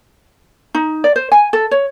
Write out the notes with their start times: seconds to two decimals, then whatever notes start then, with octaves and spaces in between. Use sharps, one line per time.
0.75 D#4
1.04 D5
1.16 C5
1.32 G#5
1.53 A4
1.71 C#5